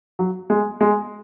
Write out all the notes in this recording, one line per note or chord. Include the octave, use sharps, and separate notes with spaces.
F#3
G#3
G#3